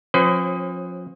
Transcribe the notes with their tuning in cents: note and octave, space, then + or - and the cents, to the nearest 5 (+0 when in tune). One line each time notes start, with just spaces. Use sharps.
F3 +30 C#4 -45 B4 +40